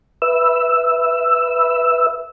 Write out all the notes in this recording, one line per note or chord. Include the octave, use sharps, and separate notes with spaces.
B4 E5 E6